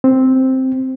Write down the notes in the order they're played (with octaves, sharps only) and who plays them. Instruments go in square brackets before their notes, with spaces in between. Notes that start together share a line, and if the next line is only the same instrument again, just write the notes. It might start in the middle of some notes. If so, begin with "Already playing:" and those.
[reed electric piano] C4